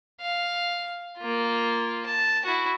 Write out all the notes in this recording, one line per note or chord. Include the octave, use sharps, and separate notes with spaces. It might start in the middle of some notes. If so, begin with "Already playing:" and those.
F5
A#3 F4
A5
E4 F#4